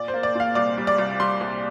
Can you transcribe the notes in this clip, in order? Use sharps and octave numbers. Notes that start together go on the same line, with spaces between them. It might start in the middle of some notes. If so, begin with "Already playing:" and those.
Already playing: A#2 D5
C5
A#3
D5
A#2 F5
C2 D5
G3
D5
C2
G3 C6
C2